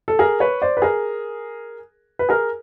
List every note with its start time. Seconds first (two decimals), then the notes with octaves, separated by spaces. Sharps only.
0.08 A4
0.19 G#4 A#4
0.40 B4 C#5
0.62 C5 D5
0.77 B4
0.82 G#4 A#4
2.19 B4
2.29 G#4 A#4